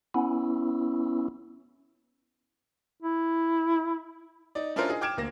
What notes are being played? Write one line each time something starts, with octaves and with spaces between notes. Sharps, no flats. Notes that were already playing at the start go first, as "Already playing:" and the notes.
B3 C#4 E4
E4
D#4 D5
C#4 D4 E4 F4 A#4 C5
D#4 G#4 D#5
G5 D6 F6 G#6 D7 E7
D2 A#3 A#6